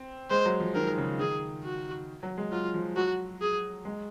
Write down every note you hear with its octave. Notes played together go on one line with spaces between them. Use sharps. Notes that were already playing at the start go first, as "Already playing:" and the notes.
Already playing: C4
G#3 C5
F#3
F3
D#3 A#4
C#3
D#3 G#4
F#4
F#3
G#3
F#3 F4
F3
F#3 F#4
G#4
G#3